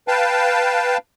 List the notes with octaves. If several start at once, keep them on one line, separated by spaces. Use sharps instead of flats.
B4 F5 G5 A5